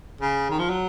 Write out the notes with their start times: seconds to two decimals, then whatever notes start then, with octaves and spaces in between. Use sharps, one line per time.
0.21 C#3
0.50 D#3
0.59 F3
0.70 F#3